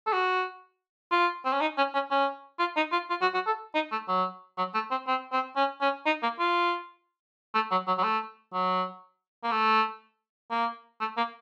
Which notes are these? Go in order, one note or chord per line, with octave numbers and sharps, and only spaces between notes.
A4
F#4
F4
C4
C#4
D#4
C#4
C#4
C#4
F4
D#4
F4
F4
F#4
F#4
A4
D#4
A3
F#3
F#3
A3
C4
C4
C4
C#4
C#4
D#4
A#3
F4
A3
F#3
F#3
F#3
A3
F#3
A#3
A3
A#3
A3
A#3